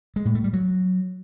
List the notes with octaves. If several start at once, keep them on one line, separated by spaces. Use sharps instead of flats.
G#3
A2
A3
G3
F#3